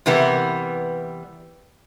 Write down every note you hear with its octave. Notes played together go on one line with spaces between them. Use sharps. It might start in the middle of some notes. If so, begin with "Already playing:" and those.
C3 E3 G3 B3 A#4